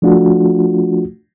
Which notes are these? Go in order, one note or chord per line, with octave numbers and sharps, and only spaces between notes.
F3 A3 D4 F4 F#4